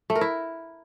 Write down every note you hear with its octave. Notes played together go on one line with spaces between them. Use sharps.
A3
A#4
E4